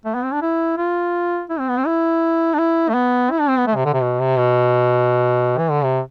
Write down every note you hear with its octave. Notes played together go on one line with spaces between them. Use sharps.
A3
B3
C4
D4
E4
F4
E4
C4
B3
C4
E4
D4
E4
A3
B3
E4
D4
C4
B3
A3
C3
D3
C3
B2
C3
B2
E3
D3
C3